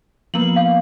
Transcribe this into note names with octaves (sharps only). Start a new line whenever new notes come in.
F3 A#3 B3 F#7
F5